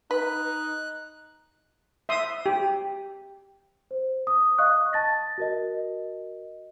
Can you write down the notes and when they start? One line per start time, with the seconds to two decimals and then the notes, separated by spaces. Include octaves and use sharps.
0.11 D#4 B4 F#6
2.09 E5 C6 D#6
2.46 G4
3.91 C5
4.27 D#6
4.58 D#5 F5 C#6 D#6 F#6
4.93 A5 A6 A#6
5.38 F#4 A#4 D#5